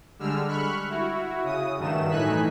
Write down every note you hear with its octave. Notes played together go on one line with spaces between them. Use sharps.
D3 G3 G#3 E6 F6
B5 C#6 F6 F#6
E4 F#4
C#3 D#6
G2 D#3 F#3 A3 E7
A2 E3 D#4 G#5 F#6 B6